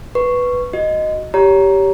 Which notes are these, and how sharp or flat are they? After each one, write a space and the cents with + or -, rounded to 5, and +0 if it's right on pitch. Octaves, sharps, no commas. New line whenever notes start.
B4 +0 C#6 +0
F#4 +0 D#5 +0
G4 -5 C#5 +20 A#5 +5